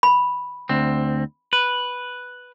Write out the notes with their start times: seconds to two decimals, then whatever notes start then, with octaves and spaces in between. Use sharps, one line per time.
0.03 B5
0.69 D2 C4
1.53 B4